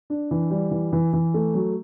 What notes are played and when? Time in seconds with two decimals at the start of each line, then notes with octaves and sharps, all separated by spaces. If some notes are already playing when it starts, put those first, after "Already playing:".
0.10 D4
0.31 E3
0.50 G3
0.71 E3
0.92 E3
1.13 E3
1.34 A3
1.54 F#3